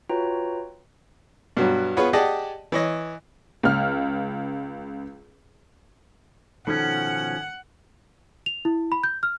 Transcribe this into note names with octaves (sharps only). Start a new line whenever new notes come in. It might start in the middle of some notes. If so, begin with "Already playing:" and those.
F4 F#4 B4 C#5 G5 A#5
G2 B2 F#3
B3 F4 G#4 B4 C#5
G4 G#4 D5 D#5 F#5 A5
E3 C#5 D#5
C#2 F6
B2 D#3 F3 C#4 A4 F#5
F7
E4
B5
G6
F6